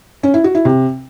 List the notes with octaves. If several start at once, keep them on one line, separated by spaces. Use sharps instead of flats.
C#4
E4
F#4
E4
C3